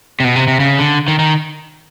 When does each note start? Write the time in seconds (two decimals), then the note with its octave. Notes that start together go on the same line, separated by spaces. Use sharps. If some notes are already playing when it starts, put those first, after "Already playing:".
0.20 C3
0.24 B2
0.36 C3
0.48 C3
0.60 C#3
0.78 D3
1.08 D#3
1.19 D#3